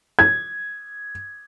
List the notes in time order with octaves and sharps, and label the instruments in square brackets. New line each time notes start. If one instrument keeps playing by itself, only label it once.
[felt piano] G#6